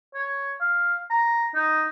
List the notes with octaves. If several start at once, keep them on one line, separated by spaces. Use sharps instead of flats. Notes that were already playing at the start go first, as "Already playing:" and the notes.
C#5
F5
A#5
D#4